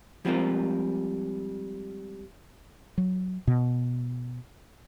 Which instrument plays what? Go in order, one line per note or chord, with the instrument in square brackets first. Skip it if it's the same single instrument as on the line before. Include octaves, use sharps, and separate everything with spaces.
[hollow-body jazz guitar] F3 G3 G#3 C4 F4 A#4
[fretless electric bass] F#3
B2